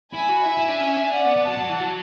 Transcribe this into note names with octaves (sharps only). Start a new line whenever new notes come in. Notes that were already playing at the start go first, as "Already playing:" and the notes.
E4 G#5 B5
F#4
E4 E5 G#5
E4
D4
C#4
D4
C#4 D5 F#5
B3
B3
F#3 F#5 A5
F#3
E3
F#3